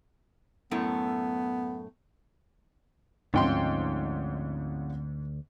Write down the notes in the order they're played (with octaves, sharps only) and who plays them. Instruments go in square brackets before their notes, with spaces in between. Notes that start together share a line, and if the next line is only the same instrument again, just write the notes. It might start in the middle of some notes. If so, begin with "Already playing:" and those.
[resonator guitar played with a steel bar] F#2 A2 A3 [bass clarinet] B3
[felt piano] G#1 F3 C#4 [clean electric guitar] D2 [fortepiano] G#2 G5 C6